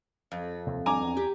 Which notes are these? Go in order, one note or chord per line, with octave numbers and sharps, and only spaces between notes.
F2
D#2 C3
G#1 G3 D4 G#5 A#5 D6
E2
G4